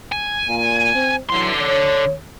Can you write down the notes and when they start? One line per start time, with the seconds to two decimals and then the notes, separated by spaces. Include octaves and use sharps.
0.12 G#5
0.48 A#2
0.94 C4
1.30 D3 E3 F#3 C6
1.61 C#5